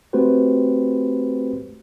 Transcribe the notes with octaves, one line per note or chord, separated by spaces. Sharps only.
A3 C4 F#4 G4 B4 C5